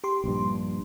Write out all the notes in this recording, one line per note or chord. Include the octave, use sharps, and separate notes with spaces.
G4 C6
A#1 G2